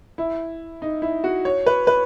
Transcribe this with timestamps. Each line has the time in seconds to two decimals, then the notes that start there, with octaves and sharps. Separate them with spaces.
0.18 E4
0.82 D#4
1.02 E4
1.24 F#4
1.45 C#5
1.66 B4
1.87 B4